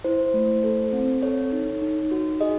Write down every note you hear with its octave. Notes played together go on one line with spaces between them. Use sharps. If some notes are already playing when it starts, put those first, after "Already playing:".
E4 C5
A3
A4
C4
A4 C#5
D#4
D#4
F#4
G#4 D#5